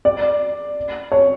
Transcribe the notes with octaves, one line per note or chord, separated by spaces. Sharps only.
D5
C#5